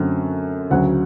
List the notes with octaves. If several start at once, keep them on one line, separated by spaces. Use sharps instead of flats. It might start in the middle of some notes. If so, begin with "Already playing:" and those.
Already playing: F#2 D3 F#3 A3 C4
D2 C#3 F#3 F#5